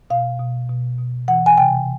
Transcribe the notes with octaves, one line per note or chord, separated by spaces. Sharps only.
B2 F5
B2
B2
B2
E3 F#5
G#5
C3 G5